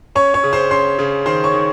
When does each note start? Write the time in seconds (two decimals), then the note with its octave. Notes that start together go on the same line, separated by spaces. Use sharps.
0.15 C#4 C#5 C#6
0.34 C#5 C#6
0.44 C#3
0.53 C5 C6
0.71 C#4 C5 C6
0.99 C#3
1.26 D#3 C5 C6
1.44 C#5 C#6
1.54 D#3